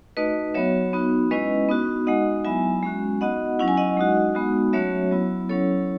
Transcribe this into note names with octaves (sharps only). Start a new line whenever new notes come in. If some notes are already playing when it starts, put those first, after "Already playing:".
A3 D#4 F#4 B4 D#5
F#3 B3 F#4 C#5 E5
B3 D#4 F#4
G#3 C#4 E4 B4 D#5
B3 D#4 F#4
G#3 D#4 F#4 D#5 F#5
F#3 B3 E4 E5 G#5
G#3 C#4 F#4
B3 D#4 F#4 D#5 F#5
F#3 C#4 E4 F#5
G#5
D#5 F#5
G#3 D#4 F#4
G#3 B3 D#4 F#4
F#3 A3 C#4 F#4 C#5 E5
F#3 B3 E4
F#3 C#4 E4 A4 C#5